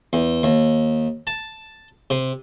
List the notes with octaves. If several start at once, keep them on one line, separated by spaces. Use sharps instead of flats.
E2
D#2
A5
C3